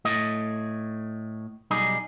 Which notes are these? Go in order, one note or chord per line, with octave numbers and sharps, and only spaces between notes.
A2 A3 D#5
B1 G3 D#4 G#4